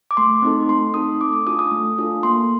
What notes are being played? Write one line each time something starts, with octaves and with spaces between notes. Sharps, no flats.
D6
A3 C6
C4 D#4 A4
A3 C6
C4 D#4 A4 D#6
A3 D6
D6
D4 F4 A4 D#6
D#6
A3
D4 F4 A4
A#3 C6